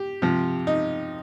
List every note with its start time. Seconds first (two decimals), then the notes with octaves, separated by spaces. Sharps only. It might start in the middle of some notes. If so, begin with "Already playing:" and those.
Already playing: G4
0.22 C3 F3
0.67 D#4